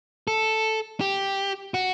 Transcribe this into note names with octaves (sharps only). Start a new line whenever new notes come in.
A4
G4
F#4